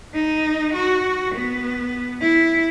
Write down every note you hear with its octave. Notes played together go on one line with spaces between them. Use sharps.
D#4
F#4
B3
E4